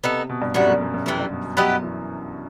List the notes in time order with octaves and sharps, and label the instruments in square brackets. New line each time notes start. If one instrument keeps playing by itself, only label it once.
[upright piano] C3 [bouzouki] B3 D#4 A4
[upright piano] B2
G2
[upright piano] F#2 [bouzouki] A2 G3 B3 F#4
[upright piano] F#2
F#2
F#2
[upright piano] F#2 [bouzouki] C3 E3 A3 E4
[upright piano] G2
B2
B2
[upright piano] F#3 [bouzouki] B3 E4 G4 D#5
[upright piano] E3